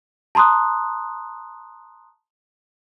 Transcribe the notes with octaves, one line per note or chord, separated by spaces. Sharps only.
A5 A#5 C6 D#6 F#6